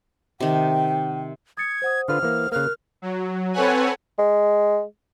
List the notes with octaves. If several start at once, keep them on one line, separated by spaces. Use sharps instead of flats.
C3 D#3 G5
D#6 G#6 A6 C#7
C5 F#5 D#6
D3 F4 B4 F6
E3 A#3
C#3 A#3 A#4 F6 F#6
F#3
C4 A4 B4 C#5 F#5 G#5
G#3